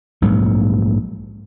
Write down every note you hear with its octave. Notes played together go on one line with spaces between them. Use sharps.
A#1 G#2 F#3